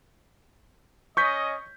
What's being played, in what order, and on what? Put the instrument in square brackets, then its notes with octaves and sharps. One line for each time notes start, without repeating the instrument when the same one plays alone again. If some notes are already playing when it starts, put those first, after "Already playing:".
[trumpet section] C#4 D#5 [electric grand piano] C#6 G6 B6